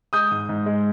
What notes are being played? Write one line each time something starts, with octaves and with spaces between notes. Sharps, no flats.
G#3 D#6 G6
G#2
G#2
G#3